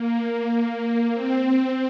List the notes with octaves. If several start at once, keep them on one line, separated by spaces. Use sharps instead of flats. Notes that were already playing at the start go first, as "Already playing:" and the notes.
Already playing: A#3
C4